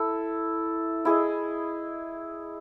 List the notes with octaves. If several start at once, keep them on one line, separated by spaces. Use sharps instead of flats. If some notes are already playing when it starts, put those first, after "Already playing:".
Already playing: E4 A4
E4 G#4 D#5